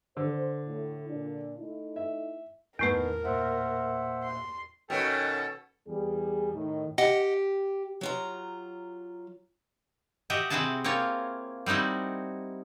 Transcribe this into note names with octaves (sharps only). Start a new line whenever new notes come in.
D3 C5
A2
A#2 D4
A3 D#4 E4
E5
E2 A2 D#3 A3 B3 A#4
A#2 C5 E5 F#5
C6
B2 D#3 F#3 C#4 A4 G5
E2 G3 G#4
A2 D#3
G4 D#5 F#5
F#3 F4 A#5
F#4 G4 D#5 E5
C3 C4 E4 F#4 G#4 A5
A#3 C4 E4 F4 C#5
G3 C4 D#4 E4 F#4